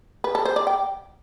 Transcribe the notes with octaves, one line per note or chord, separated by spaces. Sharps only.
B4
A4
C5
D5
G5